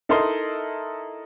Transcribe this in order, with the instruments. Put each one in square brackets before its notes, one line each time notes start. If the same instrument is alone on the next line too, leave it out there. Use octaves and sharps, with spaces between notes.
[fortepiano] D#4 E4 A4 A#4 D#5 C6